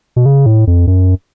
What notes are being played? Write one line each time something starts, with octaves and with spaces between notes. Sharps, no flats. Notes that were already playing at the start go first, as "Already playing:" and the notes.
B2
C#3
A2
F2
F#2